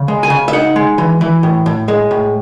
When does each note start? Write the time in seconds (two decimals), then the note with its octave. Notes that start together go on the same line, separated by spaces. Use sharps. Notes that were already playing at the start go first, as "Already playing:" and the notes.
Already playing: C#3
0.08 G#3
0.23 G#5
0.30 C#3
0.48 E5
0.53 D#4 F#5
0.76 G#3
0.98 E3
1.21 E3
1.43 A2
1.66 A2
1.88 G#3
2.11 A2